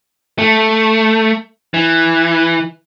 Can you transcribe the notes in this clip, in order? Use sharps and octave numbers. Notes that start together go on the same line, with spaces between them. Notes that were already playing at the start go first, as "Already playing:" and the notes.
A3
E3